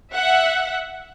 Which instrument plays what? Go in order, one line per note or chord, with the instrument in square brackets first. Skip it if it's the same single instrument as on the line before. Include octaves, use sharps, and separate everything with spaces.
[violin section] E5 F#5